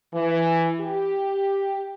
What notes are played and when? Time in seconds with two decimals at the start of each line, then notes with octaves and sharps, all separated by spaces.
0.14 E3
0.81 G4